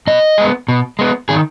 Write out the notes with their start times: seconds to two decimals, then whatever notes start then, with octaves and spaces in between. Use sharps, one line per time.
0.07 B2 D#5
0.38 G#3 B3
0.68 B2
0.99 G#3 B3
1.29 D#3 G#4